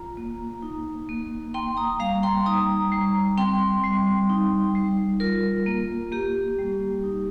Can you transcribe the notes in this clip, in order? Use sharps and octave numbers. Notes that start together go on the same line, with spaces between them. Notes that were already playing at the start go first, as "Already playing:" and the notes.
Already playing: F4 A#5
A#3
D#4
A#3
A#3 G5 C6
A#5 D#6
G3 F5 A#5
G5 C6
D#4 A#5 D#6
G3
C4 G5 C6
G3
D#4
G3
F4 A#4
A#3
A#3 G4
G3
D#4